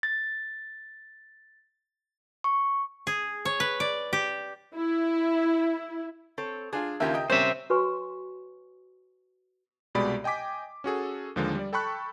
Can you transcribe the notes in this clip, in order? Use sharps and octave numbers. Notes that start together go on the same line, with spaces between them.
A6
C#6
G#4
C#5
B4
D5
G4
E4
C4 A4 C#5
D4 F4 G#4
D#2 C#3 F4 G4 A#4 E5
D#5 G5
G3 C4 C#4 A#4 C5 E5
F#4 B4 C#5 G#5 C6 C#6
C2 B2 G#3 G4 D5 B5
D#5 G5 G#5 D6 B6
C#4 F#4 G#4 A4
D#2 D3 F3 G#3 A#3
G3 D5
A4 G5 A5 B5 C#6 F#6